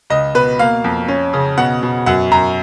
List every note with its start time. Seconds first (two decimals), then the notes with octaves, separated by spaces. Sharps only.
0.10 C#2 D#5
0.34 B2 B4
0.59 A#3 F5
0.84 F2
1.08 C#4
1.33 C#3
1.57 B2 F#5
1.83 B2
2.06 F#2 F#5
2.31 F#2 A#5